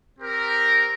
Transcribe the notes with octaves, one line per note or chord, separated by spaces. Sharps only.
C4 G4 A#4